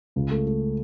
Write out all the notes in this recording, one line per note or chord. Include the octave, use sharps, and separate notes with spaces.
C#2
A3
A3